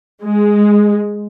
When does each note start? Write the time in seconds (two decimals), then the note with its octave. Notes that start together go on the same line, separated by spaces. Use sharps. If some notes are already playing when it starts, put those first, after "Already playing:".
0.25 G#3